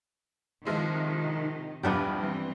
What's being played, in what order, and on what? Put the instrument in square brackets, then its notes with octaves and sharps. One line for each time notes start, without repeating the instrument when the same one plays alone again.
[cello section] C3 D#3 [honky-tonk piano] F3 G#3 E4
[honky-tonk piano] A#1 E2 G2 [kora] B3 D4 G4
[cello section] E3 G3 C4